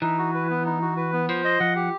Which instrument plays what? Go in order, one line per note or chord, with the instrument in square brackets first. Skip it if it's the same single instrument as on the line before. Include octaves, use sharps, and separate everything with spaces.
[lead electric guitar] E3 [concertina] D#4
[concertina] F#4
B4
B3
D#4
F#4
B4
B3
[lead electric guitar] F3 [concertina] C5
[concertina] D#5
[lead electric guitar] F3 [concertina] F#5
[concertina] G4